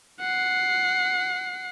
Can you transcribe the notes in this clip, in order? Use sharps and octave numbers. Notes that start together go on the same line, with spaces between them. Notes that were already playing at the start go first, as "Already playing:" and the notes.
F#5 C7